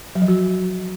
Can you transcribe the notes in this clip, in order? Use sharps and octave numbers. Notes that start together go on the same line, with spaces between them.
F#3
F3
F#4